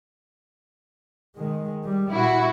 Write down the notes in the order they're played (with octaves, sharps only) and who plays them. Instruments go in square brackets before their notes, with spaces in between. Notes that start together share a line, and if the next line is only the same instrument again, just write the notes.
[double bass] D#3 G#3
G3
[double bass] A#2 [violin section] E4 F#4